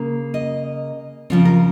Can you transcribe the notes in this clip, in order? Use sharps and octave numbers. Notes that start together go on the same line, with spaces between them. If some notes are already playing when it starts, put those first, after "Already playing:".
Already playing: C#3 A#3
D#5
C#3 F3 C4 C#5
A#4